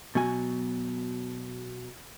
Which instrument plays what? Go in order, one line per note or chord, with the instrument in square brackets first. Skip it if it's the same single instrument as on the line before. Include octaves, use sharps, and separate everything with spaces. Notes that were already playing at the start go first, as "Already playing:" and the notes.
[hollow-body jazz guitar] B2 F#3 F#4 G#5